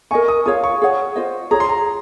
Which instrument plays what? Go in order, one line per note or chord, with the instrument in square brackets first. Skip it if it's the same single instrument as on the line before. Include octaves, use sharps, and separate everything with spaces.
[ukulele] A#4 D#5 G#5 [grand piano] C#6
[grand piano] D#6
[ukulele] F4 G#4 C#5 F5 [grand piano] D#6
[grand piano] C#6
[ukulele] G#4 C#5 F#5
F4 C5 D#5
[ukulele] F4 G#4 C#5 [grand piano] A#5
[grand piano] C6
A#5